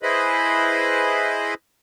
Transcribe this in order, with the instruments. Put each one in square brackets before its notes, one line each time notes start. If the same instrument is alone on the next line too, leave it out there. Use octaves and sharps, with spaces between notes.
[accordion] E4 G#4 B4 C5 D#5 B5